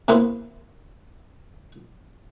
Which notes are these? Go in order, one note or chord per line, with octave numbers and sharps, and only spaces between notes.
C3 A#3 B3 E4 B4 C6